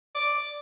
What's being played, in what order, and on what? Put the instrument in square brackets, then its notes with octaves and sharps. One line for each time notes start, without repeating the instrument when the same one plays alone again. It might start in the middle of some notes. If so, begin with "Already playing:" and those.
[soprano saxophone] D5